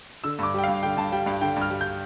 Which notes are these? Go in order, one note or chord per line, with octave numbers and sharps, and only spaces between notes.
D3 E6
G2 D6
G3 G5
G2 F5
D3 G5
G2 A5
G3 G5
G2 F5
D3 G5
G2
F6
G3
G6